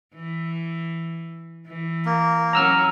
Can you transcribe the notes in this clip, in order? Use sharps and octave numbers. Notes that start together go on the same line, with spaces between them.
E3
E3
A#3
F#3 C#4 A#5 E6 F6